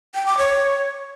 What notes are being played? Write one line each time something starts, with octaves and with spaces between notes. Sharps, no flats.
G5
D6
C#5